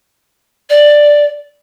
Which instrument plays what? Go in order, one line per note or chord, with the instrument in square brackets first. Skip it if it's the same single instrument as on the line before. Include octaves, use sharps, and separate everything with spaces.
[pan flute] D5